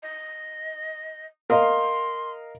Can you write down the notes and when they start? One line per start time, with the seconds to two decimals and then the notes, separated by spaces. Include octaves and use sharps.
0.02 D#5
1.50 A#4 D#5 F5 C6